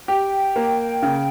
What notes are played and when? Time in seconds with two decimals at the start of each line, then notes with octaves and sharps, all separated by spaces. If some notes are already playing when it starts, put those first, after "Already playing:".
0.08 G4 G5
0.56 A#3
1.03 C#3